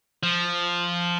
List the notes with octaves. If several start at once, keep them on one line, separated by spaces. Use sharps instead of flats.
F3